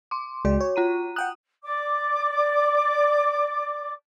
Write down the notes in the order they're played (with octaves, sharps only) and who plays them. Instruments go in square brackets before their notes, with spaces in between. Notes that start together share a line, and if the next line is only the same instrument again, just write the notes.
[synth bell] C6 D6
[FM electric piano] C#2 G#3 D5 [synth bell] F#4
[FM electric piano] C#5
[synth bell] F4 A#5 D#7
[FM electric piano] F#5 G5 F#6 [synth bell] D#6
[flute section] D5 D6